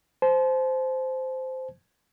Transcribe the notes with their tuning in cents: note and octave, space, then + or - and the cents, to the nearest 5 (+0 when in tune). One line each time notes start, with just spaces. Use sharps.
C5 -10 A5 -40